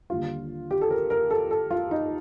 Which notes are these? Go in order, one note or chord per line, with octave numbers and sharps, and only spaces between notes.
D#2 D3 G3 F4
G4
A4
A#4
A#4
A4
A4
F4
D#4